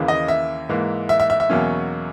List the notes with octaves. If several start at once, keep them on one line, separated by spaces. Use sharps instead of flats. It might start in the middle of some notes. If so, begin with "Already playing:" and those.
Already playing: D#2 C#3 E3 A#3
D#5
E5
G#2 E3 A#3
E5
E5
E5
E5
E2 B2 F#3 A#3 C#4